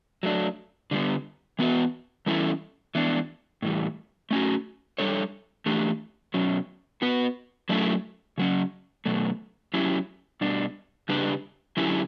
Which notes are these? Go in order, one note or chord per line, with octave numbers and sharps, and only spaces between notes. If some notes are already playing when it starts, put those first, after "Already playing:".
F#3 A3 D4
D3 G3 B3
E3 B3 F#4 B4 E5
E3 G3 C#4 E4 A4
E3 B3 D4
A2 E3 G3
A3 C#4 F#4
G3 D4 A4 C#5
E3 A3 D4 G4
B2 F#3 C#4
B3 F#4 B4
F#3 A3 C#4 E4 A4
C#3 F#3 C#4
B2 F#3 A3
F#3 C#4 E4 G4
B2 G3 D4
C#3 G3 D4 G4 B4
D3 F#3 C#4 E4 G4